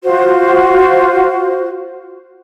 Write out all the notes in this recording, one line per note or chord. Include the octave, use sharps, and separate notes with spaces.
F4 F#4 C5